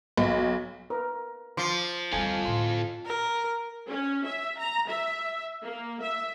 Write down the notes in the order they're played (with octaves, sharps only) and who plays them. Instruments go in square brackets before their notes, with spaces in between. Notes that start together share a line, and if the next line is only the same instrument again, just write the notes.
[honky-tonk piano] B1
[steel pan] A#4 B4
[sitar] F3 [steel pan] C6 D6
[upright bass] D2 G3 [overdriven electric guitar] F4 A4 [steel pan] G#5
[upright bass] A2 D3 [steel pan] C6
[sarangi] A#4
[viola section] C#4
E5
A#5
E5
A#3
E5